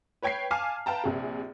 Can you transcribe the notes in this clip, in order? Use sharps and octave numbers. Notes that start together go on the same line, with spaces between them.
B4 C#5 G5 G#6 B6 C7
F5 G#5 A5 D6 F6 C7
B4 F5 G5 A5 A#5
A#1 C3 G#4